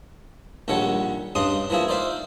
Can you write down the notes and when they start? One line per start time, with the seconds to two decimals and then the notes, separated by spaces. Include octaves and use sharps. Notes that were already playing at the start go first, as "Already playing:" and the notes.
0.68 A#1 D#3 G3 A4 C#5 F#5
1.35 G2 C#3 D4 D#5 C6 D#6
1.70 E3 F3 A#3 G#4 E5
1.88 D#4 C5 D5 E5 F5